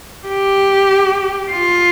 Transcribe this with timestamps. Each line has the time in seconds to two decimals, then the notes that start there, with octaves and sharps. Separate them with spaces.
0.28 G4
1.51 F4